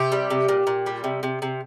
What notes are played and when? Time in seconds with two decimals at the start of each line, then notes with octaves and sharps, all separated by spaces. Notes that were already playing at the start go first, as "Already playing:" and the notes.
Already playing: C3 G4
0.12 G3
0.30 C3
0.49 A#2
0.67 A#2
0.86 G3
1.04 C3
1.23 C3
1.42 C3